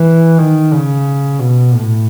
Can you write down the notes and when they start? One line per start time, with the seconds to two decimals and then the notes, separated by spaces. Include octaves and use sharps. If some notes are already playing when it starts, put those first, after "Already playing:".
Already playing: E3
0.38 D#3
0.73 C#3
1.40 B2
1.74 A2